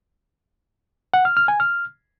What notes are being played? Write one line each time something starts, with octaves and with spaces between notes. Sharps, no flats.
F#5
F6
F6
G#5
F6